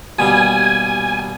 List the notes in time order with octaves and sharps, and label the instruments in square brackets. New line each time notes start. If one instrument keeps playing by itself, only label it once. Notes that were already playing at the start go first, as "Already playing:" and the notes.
[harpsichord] D#2 B2 G3 [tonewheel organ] G#5